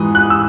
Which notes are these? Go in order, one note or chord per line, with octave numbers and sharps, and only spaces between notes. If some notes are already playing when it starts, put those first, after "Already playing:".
Already playing: G#2 E3 D#6
F#6
E6